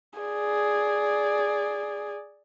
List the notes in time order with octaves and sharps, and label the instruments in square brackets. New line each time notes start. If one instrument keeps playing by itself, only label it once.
[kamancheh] G#4 D5